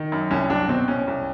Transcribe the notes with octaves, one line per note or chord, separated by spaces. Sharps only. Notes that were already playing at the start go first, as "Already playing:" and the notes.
Already playing: D#3
F#2
C2 C#4
F#3 D4
B2 C4
C2 C#4
C2